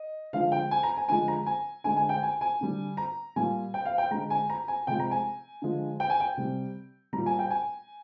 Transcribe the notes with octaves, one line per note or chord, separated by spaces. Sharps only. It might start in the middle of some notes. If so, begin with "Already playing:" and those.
Already playing: D#5
D3 F3 G#3 F5
G5
G#5
A#5
G#5
D3 F3 G#3 G#5
A#5
G#5
D3 G#3 G#5
G#5
G5
G#5
G#5
D3 G3
A#5
A#2 G3 G#5
G5
F5
G5
D3 G#3 A#5
G#5
A#5
G#5
C3 F3 G#3 G5
A#5
G#5
D3 F3 G#3
G5
G#5
G5
C3 G3
A#2 G3 A#5
G#5
G5
G#5